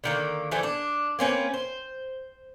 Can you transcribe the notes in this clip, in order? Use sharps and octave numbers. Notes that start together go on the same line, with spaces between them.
D3 D#3 A#3
D3 E3 F3 A3
D4
A#3 C4 C#4 B4
C5